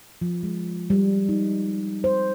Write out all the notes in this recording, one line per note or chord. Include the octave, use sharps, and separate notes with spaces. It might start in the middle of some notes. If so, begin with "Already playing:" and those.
F3
G#3
G3
D#4
C5